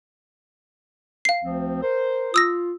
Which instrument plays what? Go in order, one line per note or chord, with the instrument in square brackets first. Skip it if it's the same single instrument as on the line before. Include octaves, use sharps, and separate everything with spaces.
[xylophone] F5 C7
[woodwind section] D2 F3 C4
A#4 C5
[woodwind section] F4 [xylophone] D#6 E6 A#6